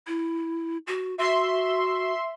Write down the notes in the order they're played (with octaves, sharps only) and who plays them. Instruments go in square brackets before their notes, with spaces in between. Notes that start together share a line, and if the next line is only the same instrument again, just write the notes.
[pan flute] E4
F#4
[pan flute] F#4 [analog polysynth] E5 C6